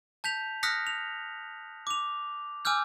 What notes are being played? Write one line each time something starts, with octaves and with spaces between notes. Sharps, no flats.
A5 G6 B6 F7
D#6 F6 F#6 A#6 B6 C#7
F7
D6 F7
G#5 D6 E6 F6 G6